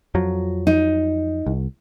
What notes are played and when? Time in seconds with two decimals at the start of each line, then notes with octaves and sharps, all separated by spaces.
0.15 F2 F3 F#3
0.67 D#4
1.46 C2